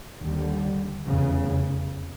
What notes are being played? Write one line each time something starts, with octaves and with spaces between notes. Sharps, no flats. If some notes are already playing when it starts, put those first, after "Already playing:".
D#2 D3 G3
F1 E2 C#3